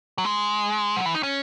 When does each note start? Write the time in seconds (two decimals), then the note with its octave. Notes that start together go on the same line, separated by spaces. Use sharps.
0.18 F#3
0.25 G#3
0.96 F#3
1.05 E3
1.15 D#4
1.23 C#4